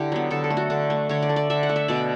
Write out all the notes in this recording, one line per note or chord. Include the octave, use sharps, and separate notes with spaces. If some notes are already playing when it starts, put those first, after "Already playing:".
Already playing: D3 E4 G4
F#3 B3
D3 A4
A4
A3
F#4
D3 D4
A3
D3 C#5
D5
A3
D5
D3 E5
F#5
A3
E5
B2 D5